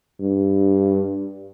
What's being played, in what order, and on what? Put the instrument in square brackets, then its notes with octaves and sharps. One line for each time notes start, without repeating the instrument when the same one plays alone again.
[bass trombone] G2